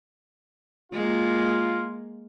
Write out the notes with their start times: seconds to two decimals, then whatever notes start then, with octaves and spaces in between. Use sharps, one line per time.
0.93 G#3 A#3 F4